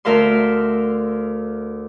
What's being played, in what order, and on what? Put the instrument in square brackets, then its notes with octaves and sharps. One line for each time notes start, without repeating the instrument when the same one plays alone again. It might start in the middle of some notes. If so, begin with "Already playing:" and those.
[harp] D2 A#4 E5 F5 C6